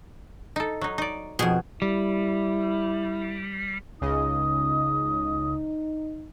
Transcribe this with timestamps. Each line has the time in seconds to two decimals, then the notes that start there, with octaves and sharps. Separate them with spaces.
0.56 D#4 A4
0.81 F#3 D#4
0.98 D#4 D5
1.39 F2 B2 G#4
1.82 G3 E4
4.01 C#2 C#3 D#4 D#5 D#6